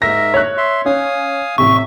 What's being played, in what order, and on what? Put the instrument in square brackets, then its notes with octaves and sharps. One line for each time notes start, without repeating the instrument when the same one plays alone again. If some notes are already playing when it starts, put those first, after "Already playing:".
[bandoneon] G#2 A#4 E5 [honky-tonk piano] A#6
[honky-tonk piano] C#5 F#6
[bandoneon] E5 C6
[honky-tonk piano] C#4 [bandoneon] F5 G#5 D#6
[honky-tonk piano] A1 C3 [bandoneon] E5 [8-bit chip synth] C#6